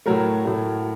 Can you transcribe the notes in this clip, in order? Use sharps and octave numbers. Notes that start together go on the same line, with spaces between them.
A2 F#3 A3 A#4
A2 F#3 A3